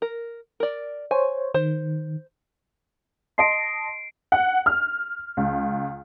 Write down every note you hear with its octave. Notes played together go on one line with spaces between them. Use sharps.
A#4
A#4 D5
C5 C#5 G#5
D#3 C5
D#5 A5 C6 C7 D7
F#5
F6
C#2